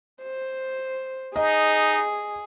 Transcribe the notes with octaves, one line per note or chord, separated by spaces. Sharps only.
C5
D#4 G#4 D#5